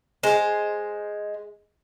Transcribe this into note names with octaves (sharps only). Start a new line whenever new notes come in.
G#3 C5